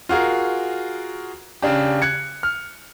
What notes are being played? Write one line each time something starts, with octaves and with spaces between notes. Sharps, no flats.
F4 F#4 G#4 A#4
C#3 D4 G4
F#6 G#6 C#7
F6